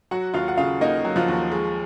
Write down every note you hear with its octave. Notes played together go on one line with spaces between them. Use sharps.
F#3 F#4 F#5
D#2 F4 F5
F#5
C#3 F4 F5
A#3 D#4 D#5
F#3
F3 F4
D#2
G#3